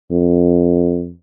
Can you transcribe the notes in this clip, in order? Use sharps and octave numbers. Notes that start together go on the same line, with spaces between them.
F2